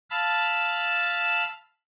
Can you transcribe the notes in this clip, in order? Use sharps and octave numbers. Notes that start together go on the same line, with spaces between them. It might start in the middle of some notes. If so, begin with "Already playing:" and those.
F5 A5 B5 E6